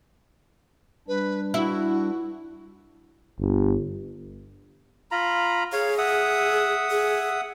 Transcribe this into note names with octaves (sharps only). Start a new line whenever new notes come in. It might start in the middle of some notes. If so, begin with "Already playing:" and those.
G3 D4 B4
E4 F#4
G1
F4 A#5 B5
G#4 C#5 F5
E5 F#5 D#6
G#4